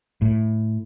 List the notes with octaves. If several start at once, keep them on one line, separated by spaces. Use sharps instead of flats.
A2